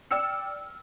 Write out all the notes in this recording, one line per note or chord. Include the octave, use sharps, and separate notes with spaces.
D5 G5 E6 F6 C#7